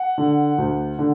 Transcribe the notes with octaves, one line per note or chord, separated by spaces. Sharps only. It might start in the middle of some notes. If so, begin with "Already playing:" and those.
Already playing: F#5
D3
D2
D3